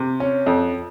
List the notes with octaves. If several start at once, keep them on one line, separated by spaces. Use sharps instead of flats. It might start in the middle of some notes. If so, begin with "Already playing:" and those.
Already playing: C3
C#4
F2